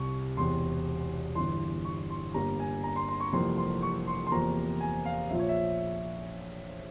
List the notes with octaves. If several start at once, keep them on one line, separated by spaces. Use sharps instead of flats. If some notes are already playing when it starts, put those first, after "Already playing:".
Already playing: C2 C3 G3 C#6
E1 E2 C3 C6
G1 G2 E3 C6
C#6
C6
G1 G2 G3 A#3 A#5
G#5
A#5
C6
C6
C#6
F1 F2 E3 G3 A#3 C6
C6
C#6
C6
C6
E2 C3 F3 A#3 A#5
G#5
F5
A#1 A#2 F3 E5
C#5
E5